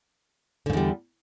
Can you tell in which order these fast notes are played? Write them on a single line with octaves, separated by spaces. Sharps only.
D3 G#2 E2 G3